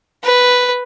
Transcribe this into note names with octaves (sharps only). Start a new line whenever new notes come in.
B4